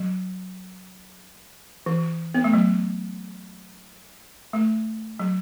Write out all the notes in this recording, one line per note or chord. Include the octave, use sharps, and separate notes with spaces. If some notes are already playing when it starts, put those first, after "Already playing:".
Already playing: F#3
E3
B3
A3
F#3
A3
F#3